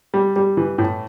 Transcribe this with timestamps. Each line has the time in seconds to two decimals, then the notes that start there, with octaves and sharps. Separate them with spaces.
0.14 G3
0.36 G3
0.57 E3
0.78 A2